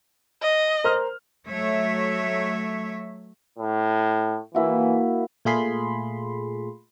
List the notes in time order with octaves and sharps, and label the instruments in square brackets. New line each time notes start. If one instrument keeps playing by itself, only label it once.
[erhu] D#5
[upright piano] A#4 C5 F6
[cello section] F#3 A3 C#5 E5
[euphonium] A2
[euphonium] E3 [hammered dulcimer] A#3 E4 F#4
[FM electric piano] A#2 A3 F4 G#4 B5 C6